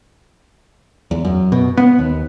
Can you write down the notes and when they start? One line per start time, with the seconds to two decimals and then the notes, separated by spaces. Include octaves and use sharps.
1.11 E2
1.25 F#2
1.52 B2
1.77 B3
1.99 D#2